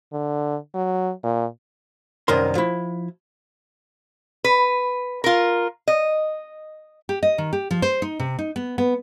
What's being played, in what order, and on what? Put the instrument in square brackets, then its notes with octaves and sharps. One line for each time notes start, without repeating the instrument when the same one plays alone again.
[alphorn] D3
F#3
A#2
[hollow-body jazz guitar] C2 F#2 D#3 A#4 C6
F3 E4
[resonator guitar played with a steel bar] B4
F4 A#4
D#5
[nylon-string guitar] G4
D#5
D#3
G4
F3
C5
D#4
C3
D#4
B3
B3